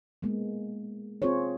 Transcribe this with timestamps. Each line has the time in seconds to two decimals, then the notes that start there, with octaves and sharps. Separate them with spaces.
0.22 G#3 A#3 B3
1.22 C4 F4 G#4 C5 C#5